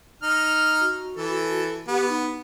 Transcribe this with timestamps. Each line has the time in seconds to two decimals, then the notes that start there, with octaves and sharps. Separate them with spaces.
0.22 D#4 F6
0.80 F#4
1.16 E3 A4
1.88 B3 G4
2.09 D#4